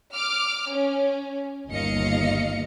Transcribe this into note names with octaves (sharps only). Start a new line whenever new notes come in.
D6 F6
C#4
G1 D#2 D#5 F5 C#7